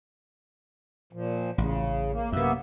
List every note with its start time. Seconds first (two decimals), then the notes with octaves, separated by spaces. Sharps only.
1.13 A#2 F3
1.58 A1 C#3
2.12 A#3
2.32 F#2 C3 A#3 B3 E5